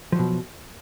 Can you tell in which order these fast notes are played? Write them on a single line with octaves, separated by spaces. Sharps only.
F3 F#3 B2